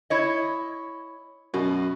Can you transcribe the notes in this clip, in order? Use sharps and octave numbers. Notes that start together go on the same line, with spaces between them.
E4 C#5 D#5
F#2 B2